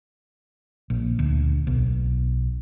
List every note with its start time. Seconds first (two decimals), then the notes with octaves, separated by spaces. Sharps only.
0.90 A#1
1.19 D2
1.67 B1